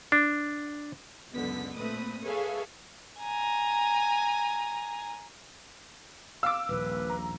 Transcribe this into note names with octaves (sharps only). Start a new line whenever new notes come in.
D4
C#2 F#2 D3 B3 B6
A#2 A3 C4 B4 D#6
G#4 A4 B4 C#5 E5 F5
G#5 A#5
F5 D6 E6
D#1 A#1 B4
A#5